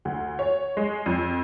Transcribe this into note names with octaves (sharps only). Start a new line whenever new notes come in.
D2
C#5
G#3
F2